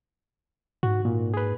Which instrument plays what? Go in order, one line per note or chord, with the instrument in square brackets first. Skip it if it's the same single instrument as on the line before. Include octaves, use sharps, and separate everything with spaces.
[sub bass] G#2 [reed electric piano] F#4
[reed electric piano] A#2
G#4 B4